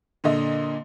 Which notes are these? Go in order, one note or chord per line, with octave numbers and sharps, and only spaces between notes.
A#2 D3 D#5